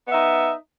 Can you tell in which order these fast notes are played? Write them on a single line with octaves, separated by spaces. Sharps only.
B3 E5 D#4